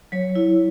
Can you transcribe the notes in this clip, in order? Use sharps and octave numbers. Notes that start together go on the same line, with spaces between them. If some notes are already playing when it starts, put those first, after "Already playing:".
F#3 C#5
E4